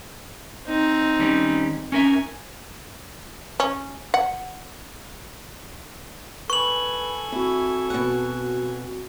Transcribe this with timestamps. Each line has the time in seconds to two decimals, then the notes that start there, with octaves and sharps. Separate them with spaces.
0.67 C4 D#4
1.19 D#3 G3 C#4
1.92 C#4 A#4 E5 G#5
3.60 C#4
4.14 F#5
6.50 A4 B4 G#5 B5 C#6 F#7
7.32 C4 E4 F#4
7.90 B2 F#5